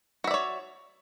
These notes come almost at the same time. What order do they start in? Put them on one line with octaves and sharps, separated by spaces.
F#4 E5 D5 C#5